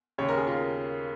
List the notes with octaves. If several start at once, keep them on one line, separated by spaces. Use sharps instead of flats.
D#2 C#3 C#5
A#4
G#4
F4 A#4